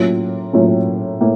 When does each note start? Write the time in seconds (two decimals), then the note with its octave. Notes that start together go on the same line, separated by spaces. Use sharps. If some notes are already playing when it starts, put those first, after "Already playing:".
Already playing: A2 F#3 A#3 C#4 F4
0.53 A2 F#3 A#3 C#4 F4
1.21 A2 A#3